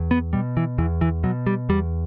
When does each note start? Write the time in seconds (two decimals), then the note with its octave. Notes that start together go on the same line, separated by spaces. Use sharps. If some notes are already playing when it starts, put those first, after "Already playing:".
Already playing: E2
0.11 B3
0.33 B2 G3
0.57 E3
0.78 E2 E3
1.01 E3
1.23 B2 F#3
1.47 G3
1.69 E2 G3